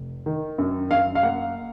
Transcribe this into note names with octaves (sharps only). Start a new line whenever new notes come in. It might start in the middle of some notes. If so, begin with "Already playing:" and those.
Already playing: F1
D#3
F#2
F#2 F5
F5
A#3 F#5